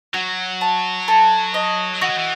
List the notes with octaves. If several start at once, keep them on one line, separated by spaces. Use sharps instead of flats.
F#3 F#4
A5
A4
D#5
E3 F#4
F#3
E3